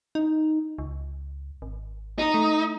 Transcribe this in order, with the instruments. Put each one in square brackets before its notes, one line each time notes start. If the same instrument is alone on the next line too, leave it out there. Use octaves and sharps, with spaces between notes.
[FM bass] D#4
C#2
G#1
[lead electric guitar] D#4
[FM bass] A3